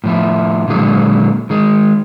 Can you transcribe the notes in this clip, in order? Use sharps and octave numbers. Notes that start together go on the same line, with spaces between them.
A2 F3 E4
A#2 D3 F#3 G#3
D#3 G#3